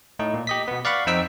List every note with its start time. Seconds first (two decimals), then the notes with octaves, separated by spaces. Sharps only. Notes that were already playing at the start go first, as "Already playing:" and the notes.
0.19 A2 D#4
0.34 A#2
0.47 G4 D#5 B6
0.68 B2 B3
0.85 D5 F5 F#5 B5 C#6
1.07 F2 C4 D#4 G5 E6 B6